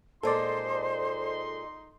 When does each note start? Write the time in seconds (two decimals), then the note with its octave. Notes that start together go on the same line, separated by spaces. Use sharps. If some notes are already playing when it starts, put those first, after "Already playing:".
0.23 A#2 G#3 D#4 A4 C5 D5 C6